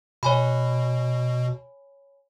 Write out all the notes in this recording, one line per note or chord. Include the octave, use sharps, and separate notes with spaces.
B2 C#5 G#5 B5